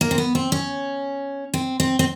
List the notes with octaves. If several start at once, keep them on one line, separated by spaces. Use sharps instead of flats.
A#3
C4
B3
C4
C#4
C4
C4
C4